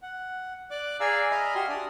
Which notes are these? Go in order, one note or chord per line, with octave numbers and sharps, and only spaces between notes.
F#5
D5 D6 F#6
G#4 D5 F5 G#5 A#5 E6
D#5 E5 A#5 B5 D#6 F6
F#4 G4 G#5 C6 F6
D4 D5 D#6